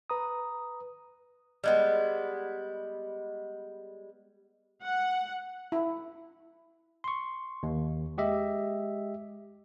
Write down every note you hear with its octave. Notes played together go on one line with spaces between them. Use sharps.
B4 A#5 D#6
G3 G#3 B3
F#5
E4
C6 C#6
D#2
G#3 G4 D#5 E5